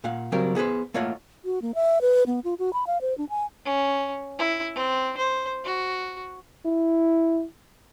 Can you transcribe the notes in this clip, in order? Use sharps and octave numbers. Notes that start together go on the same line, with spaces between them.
A#2 F5 F#5
C#3 F#3 G3 C4 A#4
B3 G#4 A4 B4 C5
A3 A#3 F4 C#5 D#5 F#5
F#4
A#3
E5
B4
B3
F4
F#4
B5
F5
C5
D4
G#5
C#4
E4
C4
C5
F#4
E4